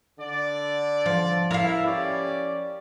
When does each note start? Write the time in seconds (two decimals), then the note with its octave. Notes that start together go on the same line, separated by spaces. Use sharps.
0.19 D3 D5
1.06 F3
1.51 E4 A#4 F5
1.86 C#4 G4 D5